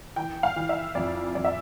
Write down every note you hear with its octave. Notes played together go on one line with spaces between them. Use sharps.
E3 G5
F5
E3
E5
F2 D5
F2 D5
E5